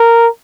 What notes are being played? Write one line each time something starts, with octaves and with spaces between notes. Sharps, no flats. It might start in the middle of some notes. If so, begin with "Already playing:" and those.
Already playing: A#4